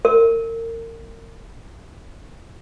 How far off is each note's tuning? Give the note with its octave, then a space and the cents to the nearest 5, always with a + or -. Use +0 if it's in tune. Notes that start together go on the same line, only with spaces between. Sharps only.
A#4 -35